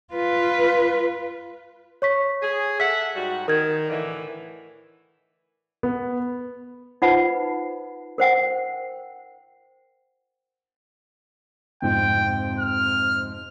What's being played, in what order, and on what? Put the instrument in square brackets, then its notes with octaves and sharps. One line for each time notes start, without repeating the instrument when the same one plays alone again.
[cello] F4 B4
[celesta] C#5 C#6 B6
[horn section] G#4
[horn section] A4 E5 F#5 [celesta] B6
[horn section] G#2 G3 F#4
[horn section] D#3 [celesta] A#4 G#6
[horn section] A2 D3 E3
[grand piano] B3
[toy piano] D#4 F4 B4 C5 F#5 B5
A#4 C5 F#5 G5
[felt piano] F2 G#2 C3 [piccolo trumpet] G5
[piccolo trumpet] F6